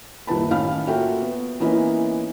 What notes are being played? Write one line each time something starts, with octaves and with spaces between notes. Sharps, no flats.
F#1 C2 D#3 B4 A5 B5
A1 D#3 C#4 F5 B5 F6
A#3 F4 F#4 A4 E5 G5
B3
E3 A#3 B3 C#4 D#4 E4